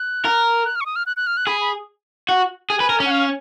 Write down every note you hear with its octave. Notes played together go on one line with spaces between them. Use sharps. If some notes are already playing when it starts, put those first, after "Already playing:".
Already playing: F#6
A#4
F#6
F6
C#6
D#6
F6
F#6
F#6
F6
F#6
G#4 B5
B5
F#4
G#4 G#5
B4
A#4
C#4 F#5
F5